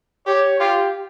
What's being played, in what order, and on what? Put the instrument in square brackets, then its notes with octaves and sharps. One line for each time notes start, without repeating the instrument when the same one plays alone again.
[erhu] G4 [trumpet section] C#5
[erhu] F4 [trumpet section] G4